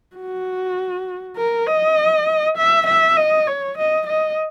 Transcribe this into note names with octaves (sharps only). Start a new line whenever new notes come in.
F#4
A#4
D#5
E5
E5
D#5
C#5
D#5
D#5